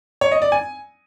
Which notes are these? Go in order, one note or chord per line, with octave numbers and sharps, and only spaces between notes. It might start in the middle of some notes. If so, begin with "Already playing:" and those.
C#5
D#5
D5
G#5